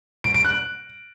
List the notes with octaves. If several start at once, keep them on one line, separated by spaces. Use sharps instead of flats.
D7
D7
F#6